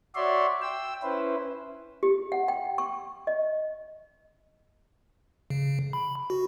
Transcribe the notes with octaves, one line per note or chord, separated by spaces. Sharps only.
F#4 C#5 D5 E5 C6
G5 E6
C#4 E4 B4 C5
G4
F#5
G5
C#6
D#5
C#3
B5
F#4